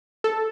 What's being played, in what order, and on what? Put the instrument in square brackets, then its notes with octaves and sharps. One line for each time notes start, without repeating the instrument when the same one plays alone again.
[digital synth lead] A4